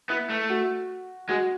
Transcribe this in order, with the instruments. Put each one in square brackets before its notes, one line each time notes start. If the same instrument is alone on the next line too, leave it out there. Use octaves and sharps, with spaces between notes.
[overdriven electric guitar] B3 [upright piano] E4
[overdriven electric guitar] A3
[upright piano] F#4
[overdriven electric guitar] G#3 [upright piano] F#4